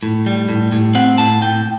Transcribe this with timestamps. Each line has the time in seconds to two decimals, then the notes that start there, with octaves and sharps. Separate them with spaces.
0.03 A2
0.26 G3
0.49 A2
0.72 A2
0.95 C4 F#5
1.18 A2 A5
1.42 A2 G5